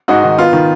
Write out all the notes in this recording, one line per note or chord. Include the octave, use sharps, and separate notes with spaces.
G#2 D#4 F#4
D#3
B3 F4
D#3